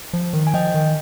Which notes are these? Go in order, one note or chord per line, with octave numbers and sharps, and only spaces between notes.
F3
D#3
G#5
F3 D#5 G5
D#3